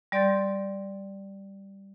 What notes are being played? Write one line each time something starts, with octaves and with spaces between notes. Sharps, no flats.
G3 D5 C6 G6 A6